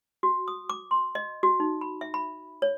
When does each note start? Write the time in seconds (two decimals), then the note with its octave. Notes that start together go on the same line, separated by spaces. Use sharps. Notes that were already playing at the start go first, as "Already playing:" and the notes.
0.23 F#4
0.48 D#6
0.70 D6
0.91 C6
1.15 D#5
1.43 F#4
1.60 D#4
1.81 B5
2.01 E5
2.14 B5
2.62 C#5